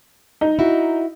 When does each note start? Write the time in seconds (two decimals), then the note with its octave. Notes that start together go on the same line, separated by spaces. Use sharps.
0.41 D#4
0.59 E4 F#4